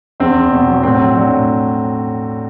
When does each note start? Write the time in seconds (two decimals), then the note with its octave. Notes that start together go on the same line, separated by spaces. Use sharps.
0.20 E2 C4
0.36 E2
0.52 B2
0.67 F#3
0.83 A2 C4
1.00 F#3
1.15 F#3 D4
1.32 A2